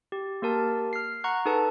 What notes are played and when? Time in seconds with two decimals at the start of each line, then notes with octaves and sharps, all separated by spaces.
0.12 G4
0.42 A#3 G4 A#4 A5
0.93 F6 C7
1.24 F#5 A#5 C#6 F#6
1.45 D#4 G#4 A4 B4 A5